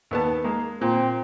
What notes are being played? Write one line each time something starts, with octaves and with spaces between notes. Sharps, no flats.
D#2 B3 A5
G#3 A#3
A#2 C4